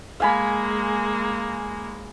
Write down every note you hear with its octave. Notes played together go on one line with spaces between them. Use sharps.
G#3 A#3 F5 G#5 B5